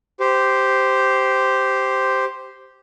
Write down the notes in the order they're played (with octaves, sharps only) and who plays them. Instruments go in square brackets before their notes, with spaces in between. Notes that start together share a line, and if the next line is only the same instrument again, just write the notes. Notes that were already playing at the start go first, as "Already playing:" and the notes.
[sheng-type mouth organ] G4 C5